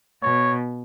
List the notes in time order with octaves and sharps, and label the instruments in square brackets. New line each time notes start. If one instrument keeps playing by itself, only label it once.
[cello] B2 [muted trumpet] C#5